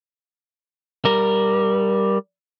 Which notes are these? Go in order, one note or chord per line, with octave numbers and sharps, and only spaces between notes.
G3 A#4